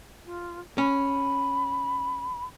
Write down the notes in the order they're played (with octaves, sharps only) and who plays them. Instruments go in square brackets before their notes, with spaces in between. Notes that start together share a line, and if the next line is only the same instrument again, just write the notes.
[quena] F4
[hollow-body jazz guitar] C#4 [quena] B5